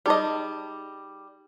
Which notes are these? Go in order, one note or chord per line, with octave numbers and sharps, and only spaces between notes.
G3 D#4 G#4 D#5 D6